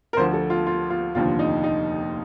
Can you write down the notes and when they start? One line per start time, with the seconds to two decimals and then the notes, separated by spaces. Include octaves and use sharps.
0.13 A#4
0.17 D2 D3 F3 C5
0.33 A4
0.50 F4
0.67 F4
0.90 F4
1.15 F1 D#2 D3 F3 F4
1.39 D#4
1.63 D#4